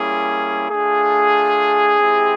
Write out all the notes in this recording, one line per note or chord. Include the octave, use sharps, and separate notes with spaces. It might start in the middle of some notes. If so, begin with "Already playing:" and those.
Already playing: G3 A#3 C#4 E4 G#4
A3 D4 F4 G#4
G#3 C4 E4 G4